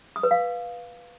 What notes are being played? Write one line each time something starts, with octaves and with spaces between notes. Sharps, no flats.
D#6
B4
F5